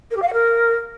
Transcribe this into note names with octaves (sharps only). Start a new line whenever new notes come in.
A#4
G4
F5
F#5
A#4